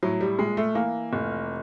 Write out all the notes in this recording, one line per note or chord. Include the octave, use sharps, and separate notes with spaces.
A2 F#3
G3
A#1 G#3
A3
E3 A#3
F1